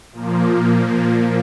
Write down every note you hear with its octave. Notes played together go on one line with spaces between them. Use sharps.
A#2 F3 A#3